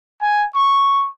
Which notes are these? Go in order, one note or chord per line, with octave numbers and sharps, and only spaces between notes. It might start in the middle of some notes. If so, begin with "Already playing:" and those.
G#5
C#6